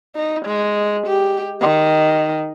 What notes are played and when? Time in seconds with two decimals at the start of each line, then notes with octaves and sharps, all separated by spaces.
0.16 D#4
0.45 G#3
1.07 G4
1.61 D#3